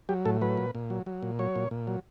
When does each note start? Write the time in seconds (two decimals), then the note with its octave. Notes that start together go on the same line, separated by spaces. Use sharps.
0.09 F#3 G4
0.25 A2 A4
0.41 F#3 B4
0.57 A#2
0.75 A#2
0.90 F#3
1.06 F#3
1.23 A#2
1.39 F#3 C#5
1.56 A#2
1.71 A#2
1.87 F#3